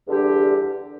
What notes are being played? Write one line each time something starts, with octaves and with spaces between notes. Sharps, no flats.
E2 D3 G3 D4 G4